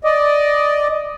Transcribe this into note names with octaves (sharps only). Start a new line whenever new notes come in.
D5 D#5